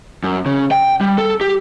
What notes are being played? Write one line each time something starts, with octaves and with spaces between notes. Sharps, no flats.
F#2
C#3
G5
G3
A4
G4